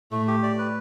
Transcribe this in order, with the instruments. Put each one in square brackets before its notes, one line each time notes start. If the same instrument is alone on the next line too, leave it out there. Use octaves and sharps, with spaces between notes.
[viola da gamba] A2 [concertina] A3
[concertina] G4
D5
B4